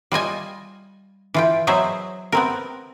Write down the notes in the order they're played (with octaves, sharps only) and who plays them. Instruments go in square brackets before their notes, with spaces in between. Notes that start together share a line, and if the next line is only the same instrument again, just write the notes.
[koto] G3 F4 D#5 G#5
E3 F4 G5
F#3 B3 G#4 C5 D#5 E5
B3 C4 A#4